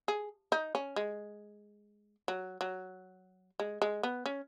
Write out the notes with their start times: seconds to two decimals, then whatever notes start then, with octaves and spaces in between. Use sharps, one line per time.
0.08 G#4
0.52 D#4
0.75 C#4
0.96 G#3
2.28 F#3
2.61 F#3
3.60 G#3
3.82 G#3
4.03 B3
4.26 C#4